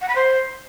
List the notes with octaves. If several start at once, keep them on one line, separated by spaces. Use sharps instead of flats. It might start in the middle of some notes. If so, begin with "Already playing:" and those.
F#5
B5
C5